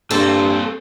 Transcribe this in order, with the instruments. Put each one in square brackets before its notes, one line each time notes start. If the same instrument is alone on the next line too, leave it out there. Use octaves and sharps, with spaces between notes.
[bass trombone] G2 [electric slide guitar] A#3 C4 C5 [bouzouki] A4